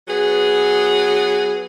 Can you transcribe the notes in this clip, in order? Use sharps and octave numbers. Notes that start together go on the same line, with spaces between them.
F#3 B3 G#4